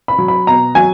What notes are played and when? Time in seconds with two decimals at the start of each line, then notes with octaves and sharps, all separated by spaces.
0.08 B5
0.19 F#3
0.28 B5
0.47 B2 A#5
0.75 F#3 G#5